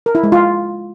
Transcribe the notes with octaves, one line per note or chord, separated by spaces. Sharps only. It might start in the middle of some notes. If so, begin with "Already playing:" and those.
A#4
E4
G#3
F4